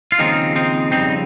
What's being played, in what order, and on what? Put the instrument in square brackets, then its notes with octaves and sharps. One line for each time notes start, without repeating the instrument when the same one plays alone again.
[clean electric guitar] F4
D#2 C#3 F3 G#3 C4 D#4
C4 D#4
F2 C#3 G3 C4 D#4